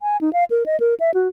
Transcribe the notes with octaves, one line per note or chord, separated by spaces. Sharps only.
G#5
D#4
F5
A#4
D#5
A#4
E5
F#4